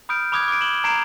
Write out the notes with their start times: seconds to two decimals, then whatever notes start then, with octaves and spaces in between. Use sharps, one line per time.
0.09 B5 D#6 F6 G6 D7
0.32 B5 D6 D#6 F#6 G#6
0.48 D6 D7
0.60 E7 F#7 G7
0.84 A#5 G#6 C7 D7 F7